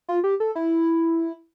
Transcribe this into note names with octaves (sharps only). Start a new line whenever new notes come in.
F4
G4
A4
E4